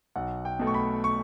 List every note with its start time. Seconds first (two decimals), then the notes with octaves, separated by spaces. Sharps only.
0.16 B1 F#5
0.45 G5
0.59 B2 A3
0.67 C#6
0.74 B5
1.04 C#6